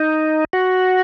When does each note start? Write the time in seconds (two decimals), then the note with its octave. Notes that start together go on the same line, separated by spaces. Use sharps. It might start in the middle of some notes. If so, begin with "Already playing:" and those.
Already playing: D#4
0.53 F#4